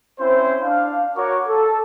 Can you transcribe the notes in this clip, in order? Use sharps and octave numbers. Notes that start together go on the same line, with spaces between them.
C4 C#4 E4 C5
D4 F5
F#4 A#4 C#5 C#6 D6
A4